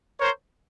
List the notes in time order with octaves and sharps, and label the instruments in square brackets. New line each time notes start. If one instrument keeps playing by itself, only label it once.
[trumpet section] A#4 C5 [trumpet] C#5